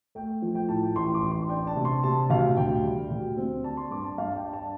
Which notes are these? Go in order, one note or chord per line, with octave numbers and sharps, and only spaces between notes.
A3 G5
F3
G5
A2 A5
G5
A1 C6
D6
A1
C6
D4 G5
A5
C3
C6
C3 A5
D2 F5
D2 G5
G3
D2
C4
D4 A5
C6
G2 D6
A5
G2 F5
A5
G5
D4
A5